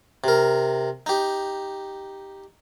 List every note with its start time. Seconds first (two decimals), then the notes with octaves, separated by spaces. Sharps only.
0.24 C3 A#4
1.06 D#4 G4